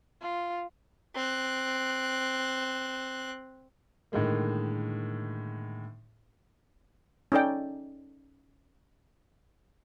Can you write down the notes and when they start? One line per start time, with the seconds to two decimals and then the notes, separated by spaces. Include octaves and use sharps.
0.22 F4
1.15 C4 F#6
4.12 A2 D3 D#3 G#3 A#3
7.32 C#4 D#4 A4 D5 G5